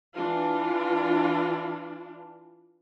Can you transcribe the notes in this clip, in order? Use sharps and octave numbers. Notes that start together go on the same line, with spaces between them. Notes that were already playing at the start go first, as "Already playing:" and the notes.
E3 D4 F4